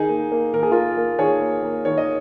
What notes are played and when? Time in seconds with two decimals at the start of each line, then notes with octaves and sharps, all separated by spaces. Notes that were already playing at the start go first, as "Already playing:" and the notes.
Already playing: D#3 D#4 G#4
0.09 A#3
0.32 A#3
0.53 D#3 A#4
0.63 G#4
0.71 A#3 F4 A#4
0.97 A#3
1.18 D#3 G#4 C#5
1.41 A#3
1.63 A#3
1.85 D#3 C#5
1.98 D#5